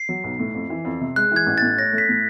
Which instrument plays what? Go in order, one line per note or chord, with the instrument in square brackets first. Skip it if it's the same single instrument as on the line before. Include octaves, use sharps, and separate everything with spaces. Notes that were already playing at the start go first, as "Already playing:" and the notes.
Already playing: [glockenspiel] C7
[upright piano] F#3
B1
A2
F2
E3
F2
C3
[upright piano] G#3 [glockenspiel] F#6
[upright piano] E3 [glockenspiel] G#6
[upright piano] A1
[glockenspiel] A6
[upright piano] A2
[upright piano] C#4 [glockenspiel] A#6
[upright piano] A3
[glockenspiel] B6
[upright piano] A2